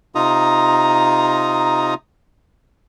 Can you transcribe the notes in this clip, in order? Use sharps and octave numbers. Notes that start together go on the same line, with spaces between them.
C3 D#4 F4 A#5 D#6